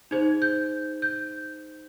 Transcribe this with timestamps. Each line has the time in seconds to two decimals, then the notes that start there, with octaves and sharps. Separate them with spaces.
0.11 D#4 G#4 C5 G#6
0.42 G6
1.02 G6